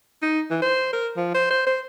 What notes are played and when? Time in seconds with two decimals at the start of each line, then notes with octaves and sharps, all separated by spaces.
0.22 D#4
0.50 E3
0.62 C5
0.93 A#4
1.16 F3
1.35 C5
1.51 C5
1.67 C5